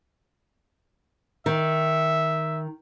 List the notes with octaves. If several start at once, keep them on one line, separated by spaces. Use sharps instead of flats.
D#3 E5